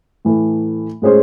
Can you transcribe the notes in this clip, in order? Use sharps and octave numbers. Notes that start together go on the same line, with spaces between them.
A2 E3 A3
A2 G#3 C#4 G#4 C5